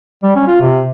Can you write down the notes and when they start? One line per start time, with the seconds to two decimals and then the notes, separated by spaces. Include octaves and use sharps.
0.23 G3
0.36 C#4
0.47 F4
0.61 C3